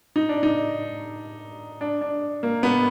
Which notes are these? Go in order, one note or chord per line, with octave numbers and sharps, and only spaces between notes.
D#4
D4
D#4
D4
D4
A#3
B3